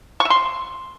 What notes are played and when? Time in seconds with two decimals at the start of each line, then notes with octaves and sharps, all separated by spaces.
0.20 C#6
0.25 E5
0.30 C6